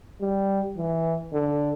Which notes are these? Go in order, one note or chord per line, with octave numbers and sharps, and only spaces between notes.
G3
E3
D3